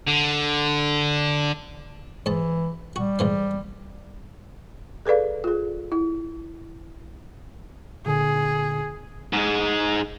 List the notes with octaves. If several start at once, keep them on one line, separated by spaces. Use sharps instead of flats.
D3
G#2 E3 A5
G3 F#4
G#2 E3 F5
G#4 A4 B4 D5 F5
F4 G#4
E4
A#2 D3 G#4
G#2 G#3